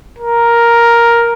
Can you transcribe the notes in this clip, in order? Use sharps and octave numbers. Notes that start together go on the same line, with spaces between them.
A#4